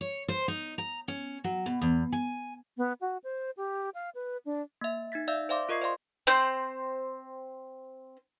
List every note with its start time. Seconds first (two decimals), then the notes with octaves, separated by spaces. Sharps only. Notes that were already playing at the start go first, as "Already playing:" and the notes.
0.01 C#5
0.28 C5
0.48 D#4
0.78 A#5
1.08 C#4
1.44 F#3
1.66 B2
1.81 E2
2.12 G#5
2.78 B3
3.01 F#4
3.24 C5
3.57 G4
3.95 F5
4.15 B4
4.45 D4
4.81 A#3 E5
5.12 D#4 G#6 A6 B6
5.28 D5 E5 F5 E6 G6
5.49 C5 D5 E5 F5 C6 D6
5.69 F4 A#4 D#5 C#6 G#6 C7
5.81 C5 D5 F5 C6
6.27 C4 C5 G6